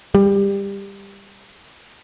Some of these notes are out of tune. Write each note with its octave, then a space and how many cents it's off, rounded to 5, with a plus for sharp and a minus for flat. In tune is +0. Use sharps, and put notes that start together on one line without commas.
G3 +20